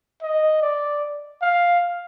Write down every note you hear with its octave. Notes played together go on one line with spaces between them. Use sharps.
D#5
D5
F5